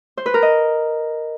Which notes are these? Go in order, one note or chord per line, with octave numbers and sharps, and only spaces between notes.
C5
B4
A#4
D#5